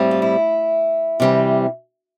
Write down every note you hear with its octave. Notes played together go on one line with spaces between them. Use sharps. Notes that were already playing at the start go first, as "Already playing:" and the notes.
Already playing: A2 G3 C4
F4
E4
C3 E3 G3 C4